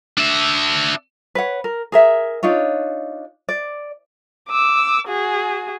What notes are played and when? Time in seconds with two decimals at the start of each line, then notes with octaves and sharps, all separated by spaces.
0.18 D4 E5
1.35 B4 C#5 F#5
1.64 A#4
1.92 G#4 A#4 E5
2.43 D4 D#4 F4 C#5
3.49 D5
4.49 D6 E6
5.08 F#4 G#4